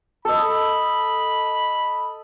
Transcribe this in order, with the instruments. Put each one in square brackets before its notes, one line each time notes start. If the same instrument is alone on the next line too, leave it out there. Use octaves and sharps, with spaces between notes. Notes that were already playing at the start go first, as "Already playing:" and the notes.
[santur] A4 D#5 [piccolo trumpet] B5